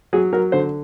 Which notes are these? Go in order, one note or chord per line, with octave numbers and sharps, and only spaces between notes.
F#3 G#4
F#3 A#4
D3 C5